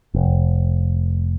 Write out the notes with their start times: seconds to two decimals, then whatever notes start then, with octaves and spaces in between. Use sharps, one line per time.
0.14 F1